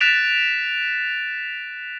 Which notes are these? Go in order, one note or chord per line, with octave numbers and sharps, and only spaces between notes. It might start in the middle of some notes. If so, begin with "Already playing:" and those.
F#6 A6 B6 D7 E7 F7